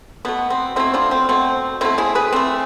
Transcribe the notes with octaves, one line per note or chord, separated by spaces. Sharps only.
B2 A3 B3
C4
B2 A3 C4 E4
D4 F4
C4
B2 A3 C4
B2 A3 C4 E4
E4 G#4
G#4 B4
E3 A3 C4